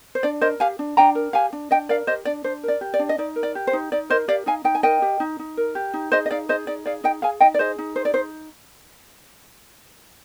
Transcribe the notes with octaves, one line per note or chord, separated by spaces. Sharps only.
C5
D4 D5
A#4 C5 D#5
G4 F5 G#5
D4
D4 G5 A#5
A#4
G4 F5 G#5
D4
D4 D#5 G5
A#4 D5 F5
G4 C5 D#5
D4 D5
D4 C5
A#4 D5
G4
D5
D4
D#5
D#4 D5
A#4
D5
G4
C5
D#4
D#4 D5
A#4 C5 D#5
G4 D5 F5
D#4 F5 G#5
D#4 G5
G#5
A#4 D#5 G5
G4
D#4
D#4
A#4
G4
D#4
G#4 C5 D#5
D#5
D#4 D5 F5
G#4 C5 D#5
D#4 D5
G#4 D5 F5
D#4 D#5 G5
G#4 F5 G#5
D#4 D#5 G5
D5
G#4 C5 D#5
D#4
G#4 C5
D5
D#4 C5